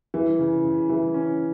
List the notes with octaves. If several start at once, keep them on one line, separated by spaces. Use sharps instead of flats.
E3
C#3
C#3
E3
C#4